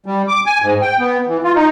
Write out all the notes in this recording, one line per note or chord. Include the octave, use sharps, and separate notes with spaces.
G3
D6
G#5
G#2
G5
B3
E3
F4
D#4